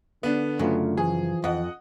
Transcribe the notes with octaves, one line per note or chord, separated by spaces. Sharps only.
D3 B3 D4
F#2 C#3 F#3 A3 F4
E3 F3 G#4
F2 D#5 F#5